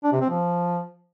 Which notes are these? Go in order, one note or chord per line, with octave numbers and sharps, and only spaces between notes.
D4
C3
C4
F3